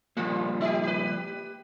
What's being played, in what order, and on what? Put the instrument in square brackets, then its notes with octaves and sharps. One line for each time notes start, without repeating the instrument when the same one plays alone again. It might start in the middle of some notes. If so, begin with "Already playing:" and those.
[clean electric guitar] F3 G3 A#3 [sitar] F4
[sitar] D#4 G4
G4 B4